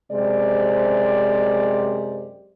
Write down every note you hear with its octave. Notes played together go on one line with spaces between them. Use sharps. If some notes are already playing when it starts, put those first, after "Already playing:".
F#2 C3 G#3 G4 C5 D5